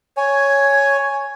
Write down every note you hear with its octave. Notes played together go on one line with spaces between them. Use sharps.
C#5 G#5